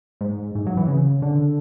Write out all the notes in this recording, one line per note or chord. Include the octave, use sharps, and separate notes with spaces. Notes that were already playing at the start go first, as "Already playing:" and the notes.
G#2
G#2
F#3
E3
C#3
D3